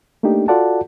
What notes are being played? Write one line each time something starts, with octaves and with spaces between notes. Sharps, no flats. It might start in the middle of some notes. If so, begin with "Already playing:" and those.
A3 A#3 D4 D#4 G4
F4 F#4 A4 D5 F#5 A5